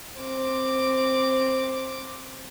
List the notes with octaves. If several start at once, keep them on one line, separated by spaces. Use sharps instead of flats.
C4 D6